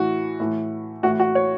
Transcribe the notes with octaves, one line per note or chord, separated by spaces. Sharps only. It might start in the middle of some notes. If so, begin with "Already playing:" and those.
Already playing: A2 E3 F#4
A2 E3
A2 E3 F#4
F#4
C#5